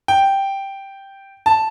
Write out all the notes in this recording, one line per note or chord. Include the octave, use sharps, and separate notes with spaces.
G5
A5